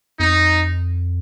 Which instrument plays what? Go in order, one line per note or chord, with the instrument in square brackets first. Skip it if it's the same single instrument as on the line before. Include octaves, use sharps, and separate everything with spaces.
[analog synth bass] F2 [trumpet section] D#4